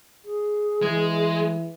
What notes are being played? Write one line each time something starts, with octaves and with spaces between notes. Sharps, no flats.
G#4
E3 G#3